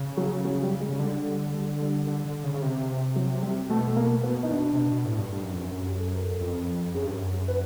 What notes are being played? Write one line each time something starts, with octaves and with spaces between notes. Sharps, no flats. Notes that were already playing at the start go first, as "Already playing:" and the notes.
Already playing: C#3
F#3
F#3
G3
G#3
C#3
D3 G3
G3
G3
G3
D3
D3
C#3
C#3
C3
F#3
G3
B2 A3
A3
A#3
B3
D#4
D4
C3
B2
B2
A2
G2
G2
F#2
F2
F#2
G4
A4
A#4
A4
F2
F#2 G#4
G2
F#2
B4